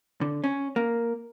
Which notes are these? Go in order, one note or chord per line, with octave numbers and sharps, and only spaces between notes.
D3
C#4
A#3